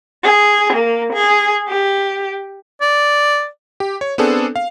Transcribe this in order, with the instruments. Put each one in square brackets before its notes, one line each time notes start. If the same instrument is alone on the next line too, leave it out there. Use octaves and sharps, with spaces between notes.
[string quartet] G#4
A#3
G#4
G4
[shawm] D5
[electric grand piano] G4
C#5
B3 C4 D4 G#4 A4
F5